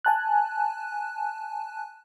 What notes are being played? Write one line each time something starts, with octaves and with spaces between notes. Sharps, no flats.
G#5 A5 F#6